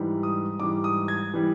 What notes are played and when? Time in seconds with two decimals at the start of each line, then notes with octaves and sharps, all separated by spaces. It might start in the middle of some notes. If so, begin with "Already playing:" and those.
Already playing: G#2 E3 G3
0.23 D#6
0.59 G#2 E3 G3 D6
0.84 D#6
1.08 G#6
1.34 E3 G3